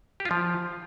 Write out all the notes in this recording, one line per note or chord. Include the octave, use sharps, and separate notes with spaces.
G4
F4
F3